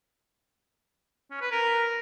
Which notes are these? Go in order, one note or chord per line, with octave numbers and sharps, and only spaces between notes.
C#4
B4
A#4